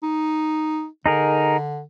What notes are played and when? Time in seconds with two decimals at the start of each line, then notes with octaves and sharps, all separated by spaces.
0.03 D#4
1.06 D3 D#4 G#4 A#4